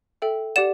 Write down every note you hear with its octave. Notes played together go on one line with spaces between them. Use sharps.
A4 E5 G5
G4 D5 F#5 E7